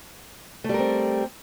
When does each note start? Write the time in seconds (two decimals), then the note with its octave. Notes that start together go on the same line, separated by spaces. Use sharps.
0.64 A3
0.69 G3
0.74 A#4
0.79 C4